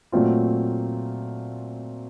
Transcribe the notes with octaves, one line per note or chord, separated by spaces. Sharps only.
A#2 F#3 A3 C4 F4